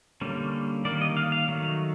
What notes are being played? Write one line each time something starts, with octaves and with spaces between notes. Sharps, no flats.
D3 G3 A#3 C#4
D#3 G3 A#3 D5
D#5
F5
F5
D#3 F#3 A3